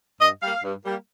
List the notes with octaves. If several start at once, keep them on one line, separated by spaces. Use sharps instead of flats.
G2 D#5
G3 A#3 F5
G2
G3 A#3